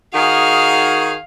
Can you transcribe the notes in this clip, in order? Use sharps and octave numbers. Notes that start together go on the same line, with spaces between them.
D#3 F#4 G#4 F5